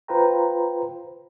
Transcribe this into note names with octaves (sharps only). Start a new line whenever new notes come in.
F4 B4 C5 G5 A#5